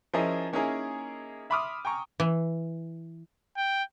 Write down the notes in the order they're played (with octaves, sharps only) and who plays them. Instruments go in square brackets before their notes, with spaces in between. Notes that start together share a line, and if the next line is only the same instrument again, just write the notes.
[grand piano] F3 C#4 E4 G#4 A#4 D#5
A#3 C#4 D#4 E4 G#4 A#4
E5 B5 C6 D6 D#6 F6
G5 G#5 A#5 C#6
[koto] E3
[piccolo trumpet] G5